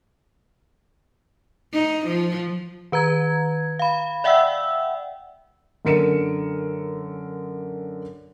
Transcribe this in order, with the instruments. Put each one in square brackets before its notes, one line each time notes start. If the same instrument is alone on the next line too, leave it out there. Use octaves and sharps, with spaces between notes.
[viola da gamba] D#4
F3
[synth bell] D#3 B4 A#5 G#6
F5 B5
D5 E5 F#5 G5 E6
[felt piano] F#2 D3 A#4 C#7 D#7 E7